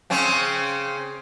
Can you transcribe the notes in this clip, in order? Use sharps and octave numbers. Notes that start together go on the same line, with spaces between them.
C#3 C4 C#4